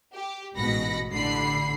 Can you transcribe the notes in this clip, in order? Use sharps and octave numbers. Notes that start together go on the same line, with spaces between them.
G4
A1 G#2 B2 B5 A#6 C#7
A1 D3 B5 C7